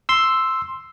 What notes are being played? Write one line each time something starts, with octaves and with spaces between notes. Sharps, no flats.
C6 E6